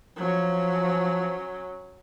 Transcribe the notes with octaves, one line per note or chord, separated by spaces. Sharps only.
F3 F#3 C#4